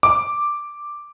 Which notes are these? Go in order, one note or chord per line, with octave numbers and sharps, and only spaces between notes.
D6